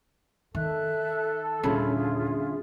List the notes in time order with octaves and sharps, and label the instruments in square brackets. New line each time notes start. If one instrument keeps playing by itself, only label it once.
[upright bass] D#3 [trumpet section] A4 [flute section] E5 F#6
[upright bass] D#1 A#3 [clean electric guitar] D3 C#4 B5 [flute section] F4 G#4 E5